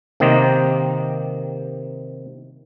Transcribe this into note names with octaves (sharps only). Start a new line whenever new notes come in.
C3 D#3 A#3 G4 C5 D#5